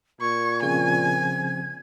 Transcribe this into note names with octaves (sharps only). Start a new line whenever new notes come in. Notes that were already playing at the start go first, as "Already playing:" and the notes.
A#2 C#6 G#6
C#3 F3 C4 G#5